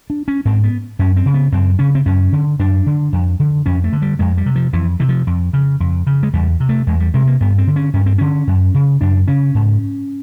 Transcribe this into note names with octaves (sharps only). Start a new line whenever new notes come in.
D4
C#4
G#2 C4
B3
F#2 C#4
C4
C#3
B3
F#2 C4
C#3 C#4
C4
F#2 C#4
D3
F#2 D4
D3
F2
D3
F2 C#4
A3
D3
G3
F2 G#3
G3
C3
F3
F2 E3
C3 E3
F3
F2
C#3
F2
C#3
G#3
E2 G3
C3
A3
E2 G#3
G3
C3 G#3
A#3
G2 B3
C4
D3
C#4
G2 C#4
C4
D3 C#4
F#2
C#3
F#2 D4
C#3 C#4
G#2